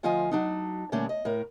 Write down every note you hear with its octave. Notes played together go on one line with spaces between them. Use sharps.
D2 F3 F4 D#5 G#5
F#3 D4 D#4
A#2 D3 G3 A3 C#4 D4
D#5
A2 A#4